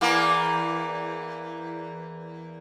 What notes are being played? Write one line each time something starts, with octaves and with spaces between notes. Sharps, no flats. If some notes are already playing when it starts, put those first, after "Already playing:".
E2 E3 A#3